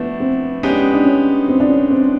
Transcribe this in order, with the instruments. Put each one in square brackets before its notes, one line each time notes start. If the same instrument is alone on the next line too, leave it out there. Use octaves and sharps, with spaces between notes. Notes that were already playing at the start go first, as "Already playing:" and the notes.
Already playing: [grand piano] F3 A3 D4 [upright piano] B3
[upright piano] C4
[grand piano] G#3 B3 D#4 G4 [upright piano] C#4
[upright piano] D4
C#4
D4
C#4
C4
D4
C#4
C4